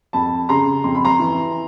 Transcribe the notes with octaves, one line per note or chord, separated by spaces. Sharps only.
F2 A5 B5
C#3 A#5 C6
F2 C6
B5
A#5 C6
E3